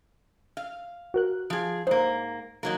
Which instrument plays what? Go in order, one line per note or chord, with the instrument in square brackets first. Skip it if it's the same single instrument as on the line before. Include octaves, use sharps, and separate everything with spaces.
[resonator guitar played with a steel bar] F5
[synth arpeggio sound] F#4 A#4 F#6
[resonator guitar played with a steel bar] F3 G#4
[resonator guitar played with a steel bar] G#2 A#3 [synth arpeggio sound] C5
[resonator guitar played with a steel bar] D#3 F#3 A#3